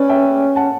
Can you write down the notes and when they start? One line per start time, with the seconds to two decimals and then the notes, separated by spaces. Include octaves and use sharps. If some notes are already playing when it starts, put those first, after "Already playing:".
Already playing: C#4 B4 D5
0.09 E5 G5
0.56 F#5 A5